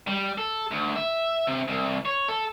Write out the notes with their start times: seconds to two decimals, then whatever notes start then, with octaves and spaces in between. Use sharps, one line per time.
0.07 G3
0.38 A4
0.71 D2
0.96 E5
1.47 C3
1.68 C2
2.05 C#5
2.28 A4